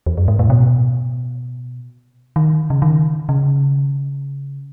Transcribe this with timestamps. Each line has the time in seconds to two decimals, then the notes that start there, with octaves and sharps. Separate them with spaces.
0.06 E2
0.18 F#2
0.28 G#2
0.39 A2
0.50 B2
2.36 D#3
2.70 C#3
2.82 D#3
3.29 C#3